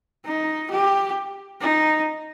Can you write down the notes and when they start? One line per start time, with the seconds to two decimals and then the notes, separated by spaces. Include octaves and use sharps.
0.25 D#4
0.71 G4
1.60 D#4